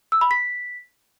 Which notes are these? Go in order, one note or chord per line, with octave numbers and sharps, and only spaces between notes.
E6
B5
B6